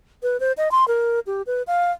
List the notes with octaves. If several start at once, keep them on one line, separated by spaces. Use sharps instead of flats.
B4
C5
D#5
C6
A#4
G4
B4
F5